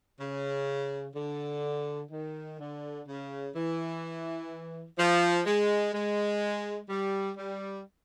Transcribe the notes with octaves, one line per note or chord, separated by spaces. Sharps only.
C#3
D3
D#3
D3
C#3
E3
F3
G#3
G#3
G3
G3